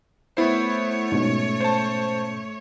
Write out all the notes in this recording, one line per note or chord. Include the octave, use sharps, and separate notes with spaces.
A3 B3 E4 C5 C#5
G#2 B2 C#4
C5 A5